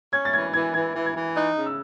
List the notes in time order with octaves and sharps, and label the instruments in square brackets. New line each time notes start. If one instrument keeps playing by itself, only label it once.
[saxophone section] C#4 [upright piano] G#6
[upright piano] A6
[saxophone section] E3 [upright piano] G#6
[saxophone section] E3 [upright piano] G#6
[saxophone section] E3 [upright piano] G#6
[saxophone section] E3
[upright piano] G#6
[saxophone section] E3
[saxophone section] D#4 [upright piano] F#6
[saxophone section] C#3
[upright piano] E6